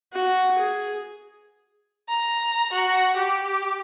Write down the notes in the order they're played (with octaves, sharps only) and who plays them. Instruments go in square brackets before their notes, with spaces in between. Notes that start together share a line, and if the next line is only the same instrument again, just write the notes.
[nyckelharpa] F#4
G#4
[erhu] A#5
F#4
G4